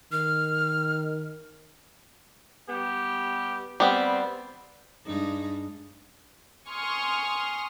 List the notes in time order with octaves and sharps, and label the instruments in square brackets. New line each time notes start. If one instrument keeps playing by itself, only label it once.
[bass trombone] D#3 [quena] F6
[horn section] G3 B3 G4
[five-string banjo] G3 B3 [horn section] C4
[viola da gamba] G2 G#3 D#4
[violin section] G#5 C6 C#6 D#6 F6